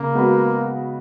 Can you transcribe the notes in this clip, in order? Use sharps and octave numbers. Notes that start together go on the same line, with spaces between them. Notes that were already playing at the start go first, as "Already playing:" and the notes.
Already playing: C#3 A#3
G#3 B3 F#4 B4